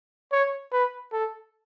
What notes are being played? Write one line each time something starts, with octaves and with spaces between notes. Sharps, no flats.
C#5
B4
A4